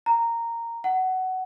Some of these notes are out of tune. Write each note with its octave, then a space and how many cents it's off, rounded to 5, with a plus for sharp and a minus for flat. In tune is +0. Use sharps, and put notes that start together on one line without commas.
A#5 -10
F#5 +15